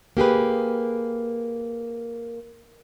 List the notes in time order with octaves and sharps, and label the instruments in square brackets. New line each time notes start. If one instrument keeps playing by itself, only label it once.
[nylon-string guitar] A#3 G4 G#4 B4